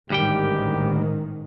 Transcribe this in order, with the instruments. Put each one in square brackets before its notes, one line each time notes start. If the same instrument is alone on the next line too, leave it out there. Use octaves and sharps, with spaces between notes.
[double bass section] A1 G#2 D#3 [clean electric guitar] D2 G3 G5 [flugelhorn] G4